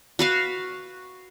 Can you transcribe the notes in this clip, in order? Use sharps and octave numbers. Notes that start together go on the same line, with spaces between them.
F#4 B4 F5